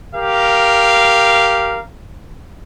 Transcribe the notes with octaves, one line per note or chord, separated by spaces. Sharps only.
G4 A#4 F5